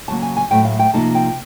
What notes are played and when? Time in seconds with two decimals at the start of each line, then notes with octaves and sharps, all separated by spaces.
0.08 C#3 F#3 A#3 A5
0.22 G#5
0.37 G#5
0.51 A2 F#3 A3 G5
0.65 F5
0.79 G5
0.94 C3 F3 A#3 D#4 A5
1.15 G5